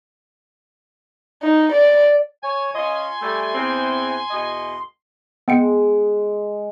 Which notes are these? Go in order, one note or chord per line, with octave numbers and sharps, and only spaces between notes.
D#4
D5
C#5 G#5
C#4 F4 D#5 C6
G3 A3
E2 C4
E2 B2 D#5
G#3 B3 G5 C#7